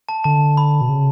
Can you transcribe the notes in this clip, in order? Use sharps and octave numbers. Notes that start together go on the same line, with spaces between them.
A5
D3 A5
B5
B2
C#3